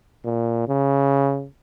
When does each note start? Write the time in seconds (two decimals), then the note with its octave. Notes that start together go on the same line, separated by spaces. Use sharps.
0.25 A#2
0.69 C#3